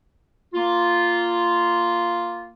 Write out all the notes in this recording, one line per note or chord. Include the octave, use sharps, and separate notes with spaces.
A#3 F4